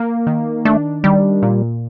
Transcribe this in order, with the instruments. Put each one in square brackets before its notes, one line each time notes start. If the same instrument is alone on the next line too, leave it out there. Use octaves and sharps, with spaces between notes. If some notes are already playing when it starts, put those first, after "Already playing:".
Already playing: [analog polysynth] A#3
D#3
[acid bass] A3 [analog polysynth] D4
[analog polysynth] D#3 [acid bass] G3
[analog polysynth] A#2